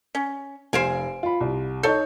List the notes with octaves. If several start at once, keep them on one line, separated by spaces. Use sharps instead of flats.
C#4
F1 C5 F5 G#5 D7
F4 B5
C2
D#4 A4 C#5 G6